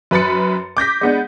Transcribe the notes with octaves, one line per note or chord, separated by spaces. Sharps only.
F#2 B4 B5 A6 C#7
D6 G6 A#6 B6
G#3 B3 D4